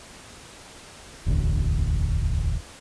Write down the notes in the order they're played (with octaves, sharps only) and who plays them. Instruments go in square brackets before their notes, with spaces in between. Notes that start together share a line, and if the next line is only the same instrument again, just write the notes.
[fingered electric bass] E1 A1 D2